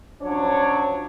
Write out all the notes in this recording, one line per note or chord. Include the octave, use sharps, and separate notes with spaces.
F3 F#3 C#4 D4 C#5